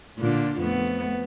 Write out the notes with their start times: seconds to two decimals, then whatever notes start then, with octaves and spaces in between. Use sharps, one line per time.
0.19 A#2 D3 D4
0.61 F2 A3 B3